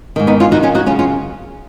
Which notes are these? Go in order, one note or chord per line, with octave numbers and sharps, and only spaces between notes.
G#2 D#3
B3 D#4
C#4 F4
F2 D#3 D#4 F#4
C#4 F4
D#4 F#4
F#2 C#3 C#4 F4
C#4 F4